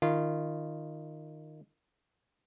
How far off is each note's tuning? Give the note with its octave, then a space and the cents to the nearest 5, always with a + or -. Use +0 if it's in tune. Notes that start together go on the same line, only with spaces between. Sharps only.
D#3 -15 F4 -25